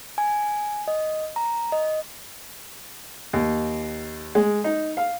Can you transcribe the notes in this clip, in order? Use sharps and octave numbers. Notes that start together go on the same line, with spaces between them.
G#5
D#5
A#5
D#5
D#2
G#3
D#4
F5